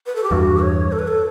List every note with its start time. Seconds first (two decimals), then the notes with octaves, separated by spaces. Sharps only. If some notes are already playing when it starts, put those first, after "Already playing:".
0.06 B4
0.15 A4
0.23 G4
0.31 E2 G2 F#4
0.62 C#5
0.92 A4
0.99 B4
1.07 A4